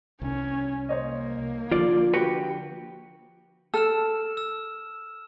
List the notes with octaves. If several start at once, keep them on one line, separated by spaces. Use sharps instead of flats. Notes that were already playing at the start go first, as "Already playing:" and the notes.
C2 C#4
A#3 C5 C#5 D#5
D3 F3 F4 D5
F#4 G4 B4 G5
A4 E6 F6 E7
E6